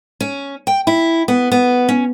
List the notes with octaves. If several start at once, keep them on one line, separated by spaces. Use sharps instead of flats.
C#4
G5
E4
B3
B3
C#4